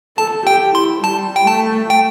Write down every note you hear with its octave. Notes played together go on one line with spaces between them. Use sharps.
A4 A5
G4 G5
E4 C6
G3 A5
G5
A3 A5
G5